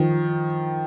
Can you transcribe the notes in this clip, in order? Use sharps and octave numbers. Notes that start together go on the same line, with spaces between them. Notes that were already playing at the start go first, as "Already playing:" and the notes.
Already playing: D#3 F3